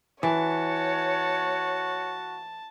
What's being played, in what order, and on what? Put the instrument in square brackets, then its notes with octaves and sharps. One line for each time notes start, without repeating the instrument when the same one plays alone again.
[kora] E3 [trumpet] F#4 [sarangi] C#5 [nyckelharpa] A5